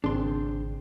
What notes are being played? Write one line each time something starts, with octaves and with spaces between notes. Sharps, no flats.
G#1 C#3 C4 D4 G#4 C6